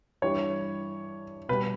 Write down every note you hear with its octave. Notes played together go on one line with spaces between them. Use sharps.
G2 E3 G3 C#5
B2 G3 B4